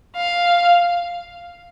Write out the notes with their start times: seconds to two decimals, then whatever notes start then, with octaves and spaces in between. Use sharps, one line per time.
0.17 F5